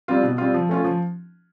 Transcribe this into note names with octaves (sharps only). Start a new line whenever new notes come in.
G3 C4 F4
B2
G3 C4 F4
F3
A3 C#4 F4
F3